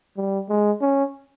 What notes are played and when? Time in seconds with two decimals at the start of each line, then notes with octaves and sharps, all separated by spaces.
0.17 G3
0.49 G#3
0.81 C#4